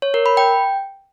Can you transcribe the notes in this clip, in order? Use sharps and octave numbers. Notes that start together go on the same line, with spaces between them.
C#5
A#4
B5
G5